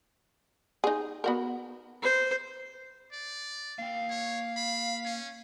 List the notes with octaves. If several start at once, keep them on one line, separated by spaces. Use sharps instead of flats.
D#4 G#4
B3 F#4 A#4
C5
D5
A#3 F5 G5
C#5
B5
C#4